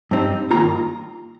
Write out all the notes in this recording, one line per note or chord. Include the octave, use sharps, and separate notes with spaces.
G2 G3 C4 D#4
G2 D#3 A#3 F4 A#5